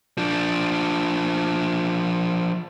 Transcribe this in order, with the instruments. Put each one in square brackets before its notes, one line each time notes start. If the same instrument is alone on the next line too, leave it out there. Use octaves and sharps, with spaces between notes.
[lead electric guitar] F3 D4